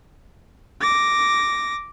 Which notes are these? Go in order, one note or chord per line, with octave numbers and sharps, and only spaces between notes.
D6 A#6